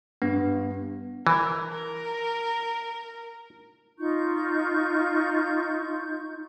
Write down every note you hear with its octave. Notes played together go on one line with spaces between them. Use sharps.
G2 B3
E3 A#4
A#4
D#4 F4 C#6 G6